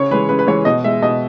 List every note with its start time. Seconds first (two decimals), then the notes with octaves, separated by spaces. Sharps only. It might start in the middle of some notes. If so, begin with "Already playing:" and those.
Already playing: C#3 C#5
0.11 E3 G#3 B4
0.29 C#3 B4
0.39 B4
0.47 E3 G#3 C#5
0.65 B2 D#5
0.84 G#3 E5
1.02 B2 D#5